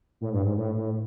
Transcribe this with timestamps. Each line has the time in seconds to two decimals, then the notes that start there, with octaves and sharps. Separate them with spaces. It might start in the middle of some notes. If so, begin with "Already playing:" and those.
0.21 A2
0.33 G2
0.45 G#2
0.58 A2
0.77 A2